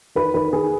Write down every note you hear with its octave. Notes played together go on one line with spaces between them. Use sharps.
D#3 B4
D#3 B4
D#3 G#4